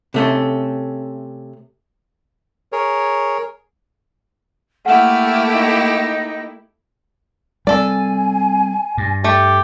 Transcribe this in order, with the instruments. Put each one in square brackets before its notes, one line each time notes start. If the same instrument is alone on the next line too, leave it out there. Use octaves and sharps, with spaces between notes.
[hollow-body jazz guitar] C3 A3 C#4
[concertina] G#4 A#4 C#5
[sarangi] A3 [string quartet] A#3 E4 G4 [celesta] F#5 E7 [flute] F6
[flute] D#4
[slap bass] G3 C4 [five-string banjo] A4 D5 [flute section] G#5
[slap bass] G2
[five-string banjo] A3 [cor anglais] G4